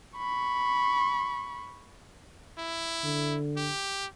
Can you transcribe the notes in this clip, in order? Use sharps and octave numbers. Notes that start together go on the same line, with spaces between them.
B5 C#6
E4
D3
G4